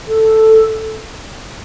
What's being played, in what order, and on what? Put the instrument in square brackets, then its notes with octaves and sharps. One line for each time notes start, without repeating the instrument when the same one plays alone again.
[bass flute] A4